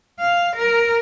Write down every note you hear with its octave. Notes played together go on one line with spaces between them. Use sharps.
F5
A#4